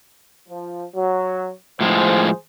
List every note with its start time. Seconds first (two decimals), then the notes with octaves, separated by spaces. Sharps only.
0.48 F3
0.95 F#3
1.81 A2 F3 G#3 G#4 C5